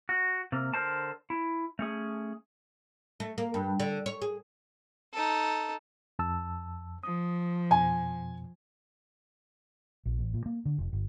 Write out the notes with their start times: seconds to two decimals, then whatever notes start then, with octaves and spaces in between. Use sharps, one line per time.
0.09 F#4
0.52 C3 A#3
0.74 D3 E4 A#4 C5 A5
1.30 E4
1.79 A3 C#4 G#4
3.20 A3
3.38 A#3
3.54 G2
3.80 D3
4.06 C#5
4.22 G#4
5.14 D#4 A4
6.19 F2 A5 E6
7.03 F3 D#6
7.71 F2 B2 G#5
10.06 A#1
10.19 A1
10.34 A#2
10.46 A#3
10.65 D3
10.78 F1
10.93 G1